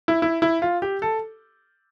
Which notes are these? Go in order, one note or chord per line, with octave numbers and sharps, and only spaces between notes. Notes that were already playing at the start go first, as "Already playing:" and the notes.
E4
E4
E4
F4
G4
A4